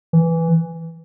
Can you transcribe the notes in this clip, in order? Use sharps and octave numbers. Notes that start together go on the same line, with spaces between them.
E3